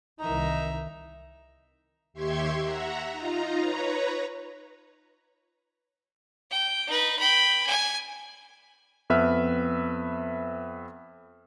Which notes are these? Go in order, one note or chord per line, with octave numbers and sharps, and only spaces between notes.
C2 D#3 E3 D#4 E5 A#5
D#2 G4 E5 C6 C#6 G#6
E5 F#5 A#5
D#4 F4 A#5
B4 C#5 A#5
G5
D#4 B4
G5 B5
G#5
F2 B3 B4 E5 F6